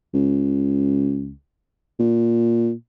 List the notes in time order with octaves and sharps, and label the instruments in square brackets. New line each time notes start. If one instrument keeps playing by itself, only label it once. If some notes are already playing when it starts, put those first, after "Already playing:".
[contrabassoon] C#2
A#2